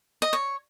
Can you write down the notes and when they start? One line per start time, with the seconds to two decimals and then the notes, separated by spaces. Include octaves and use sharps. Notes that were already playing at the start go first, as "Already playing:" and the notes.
0.22 D#5
0.33 C#5